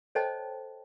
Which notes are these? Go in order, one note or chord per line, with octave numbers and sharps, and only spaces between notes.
A4 C5 C#5 D#5 G5 A5